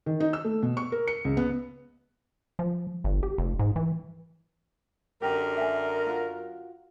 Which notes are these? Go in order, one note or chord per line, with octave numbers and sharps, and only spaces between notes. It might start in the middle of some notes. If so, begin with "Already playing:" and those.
D#3
D#4
E6
A3
B2
C#6
A#4
C#7
C#2
B3
F3
G1
G4
F1
G#2
E3
F#2 D3 G4 A#4
E5 G#5
F4 F#4